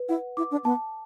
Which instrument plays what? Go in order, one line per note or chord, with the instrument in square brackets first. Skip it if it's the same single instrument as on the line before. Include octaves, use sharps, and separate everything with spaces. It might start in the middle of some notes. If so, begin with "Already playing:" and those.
Already playing: [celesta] B4
[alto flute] E4 [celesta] F#5
[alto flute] E4 [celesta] D6
[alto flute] D4
[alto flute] B3 [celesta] A5